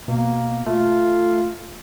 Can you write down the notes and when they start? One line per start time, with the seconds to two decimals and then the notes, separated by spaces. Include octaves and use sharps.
0.08 B2 A#3
0.66 A3 F4